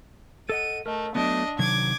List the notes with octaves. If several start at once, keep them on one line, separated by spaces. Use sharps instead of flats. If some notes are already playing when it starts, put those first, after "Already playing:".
A4 D#5 F#5 D#7
A3 A#4 D#5
F#3 A3 B3 D4 D#5
C3 D#3 F#3 D6 G#6